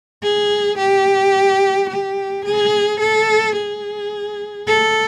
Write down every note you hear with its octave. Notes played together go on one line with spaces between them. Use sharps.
G#4
G4
G4
G#4
A4
G#4
A4